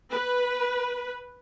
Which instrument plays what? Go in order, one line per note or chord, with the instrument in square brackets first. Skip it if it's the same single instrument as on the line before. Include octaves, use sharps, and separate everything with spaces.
[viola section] B4